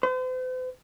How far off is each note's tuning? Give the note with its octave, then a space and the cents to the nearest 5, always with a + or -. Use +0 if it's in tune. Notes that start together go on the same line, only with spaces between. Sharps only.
C5 -45